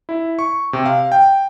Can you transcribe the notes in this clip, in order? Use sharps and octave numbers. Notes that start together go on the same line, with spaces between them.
E4
C#6
C3
F5
G5